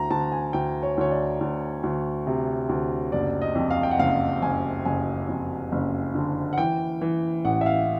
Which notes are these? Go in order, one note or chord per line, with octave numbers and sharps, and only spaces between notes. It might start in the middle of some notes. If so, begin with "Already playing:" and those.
Already playing: D2 A#5
D2 A5
G#5
D2 G5
C#5
D2 C#5
D5
D2
D2
C3
D2
F#1 D5
D#5
F2
F5
G5
F#5
F#1 F5
F#1 G#5
F#1 G#5
F2
F#1
D3
F#5
E3 G5
E3
A1 F#5
E5
F5